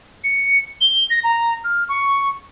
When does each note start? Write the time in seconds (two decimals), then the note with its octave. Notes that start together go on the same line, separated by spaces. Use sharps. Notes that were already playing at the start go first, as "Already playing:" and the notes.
0.24 C#7
0.81 G7
1.10 A#6
1.24 A#5
1.64 F6
1.89 C#6